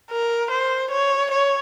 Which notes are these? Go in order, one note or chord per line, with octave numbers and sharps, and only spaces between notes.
A#4
C5
C#5
C#5